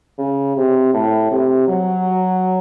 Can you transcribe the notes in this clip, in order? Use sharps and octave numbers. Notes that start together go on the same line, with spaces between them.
C#3
C3
A2
C3
F#3